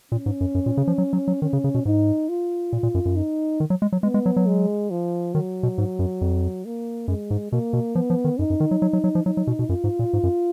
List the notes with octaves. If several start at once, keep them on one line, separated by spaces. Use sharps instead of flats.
A#2 C#4
G#2
F#2
F#2
A#2
C#3
F3
F#3
F#3
F#3
D#3 C#4
C#3
C#3
B2
G#2 D#4
F4
A#2
A#2
F#2
F#2
D#4
D#3
F#3
G#3
F#3
G#3 B3
G#3
F#3
F#3
G#3
F3
D#3 F#3
B2
G#2
F#2
F2
A#3
F#2 G#3
G#2
B2 A#3
B2
F3 B3
F3
D#3
F#2 D#4
F#2
D#3
F#3
F#3
F#3
F#3
F3
F#3 D#4
F#3
B2
B2
F#2 F4
G#2
A#2
G#2
F#2